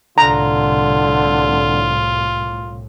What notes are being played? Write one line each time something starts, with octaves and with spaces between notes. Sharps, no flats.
C2 A2 D3 F4 A#5